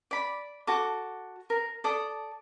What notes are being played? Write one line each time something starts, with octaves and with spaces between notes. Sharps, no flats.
D5 B5
F#4 A4 D6
A#4
A4 D5 D#6